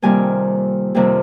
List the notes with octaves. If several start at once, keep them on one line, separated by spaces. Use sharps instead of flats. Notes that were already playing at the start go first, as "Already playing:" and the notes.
F2 C3 D#3 G3 A#3 G#5
F2 C3 D#3 G3 A#3